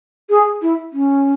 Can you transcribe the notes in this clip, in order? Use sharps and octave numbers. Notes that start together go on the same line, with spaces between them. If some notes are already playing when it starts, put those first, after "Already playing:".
G#4
E4
C#4